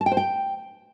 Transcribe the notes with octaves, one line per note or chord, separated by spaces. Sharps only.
A5
G5
C5
G5